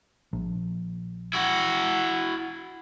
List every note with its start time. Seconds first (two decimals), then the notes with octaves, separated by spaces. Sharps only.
0.33 A#1
1.33 E4 F#4